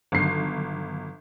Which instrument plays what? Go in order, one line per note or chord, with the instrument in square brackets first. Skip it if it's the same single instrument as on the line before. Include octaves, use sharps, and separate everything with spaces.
[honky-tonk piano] G1 C7 [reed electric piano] D3 D#3 F#3